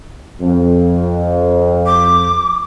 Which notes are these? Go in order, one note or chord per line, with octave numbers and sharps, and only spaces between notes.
F2
D6